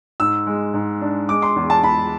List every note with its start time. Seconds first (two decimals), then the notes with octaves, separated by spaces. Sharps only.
0.20 G#2 E6
0.47 G#3
0.74 G#2
1.02 D4
1.29 G#3 D6
1.42 C6
1.56 E2
1.70 A5
1.83 E2 B5